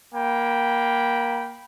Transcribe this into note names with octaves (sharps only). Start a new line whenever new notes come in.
A#3 G5 B5